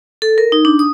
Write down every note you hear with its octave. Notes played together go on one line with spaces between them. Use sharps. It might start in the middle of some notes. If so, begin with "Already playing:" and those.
A4
A#4
D#4
D4
D#6